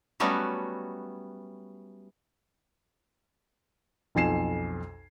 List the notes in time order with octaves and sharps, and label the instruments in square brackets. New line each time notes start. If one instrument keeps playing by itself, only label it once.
[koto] F#3 G3 A3 B3 C#4 F#4
[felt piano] B1 F2 G#5 C7 E7